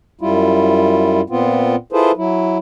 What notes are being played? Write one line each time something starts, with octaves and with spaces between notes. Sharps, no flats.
F#2 G3 E4 F4
A#2 B3 C4 F4
E4 F4 G#4 A4 B4 C5
F#3 E4